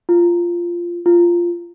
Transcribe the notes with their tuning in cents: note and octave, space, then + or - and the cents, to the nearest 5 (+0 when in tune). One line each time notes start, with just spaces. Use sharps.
F4 -10
F4 -10